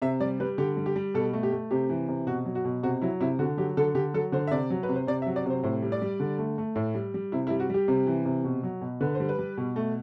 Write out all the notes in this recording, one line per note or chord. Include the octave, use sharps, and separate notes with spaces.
C3 E5
G3 D5
G3 B4
D3 G4
G3
G4
G3
B2 A4
A3
G4
A3
C3 G4
E3
C3
B2 F#4
F#3
F#4
B2
C3 F#4
F#3 E4
C3 E4
D3 F#4
F#3 G4
D3 A4
D3 G4
F#3 A4
D3 C5
E5
C3 D5
F#3
B4
C3
C5
C3 D5
E5
F#3
D5
C3 C5
A2 C5
G3
D5
G3
D3
A3
A3
A2
G3
G3
C3 E4
E4
G3
F#4
G3 G4
C3
E3
C3
B2
F#3
B2
D3 B4
C5
G3
B4
G3
B2
A3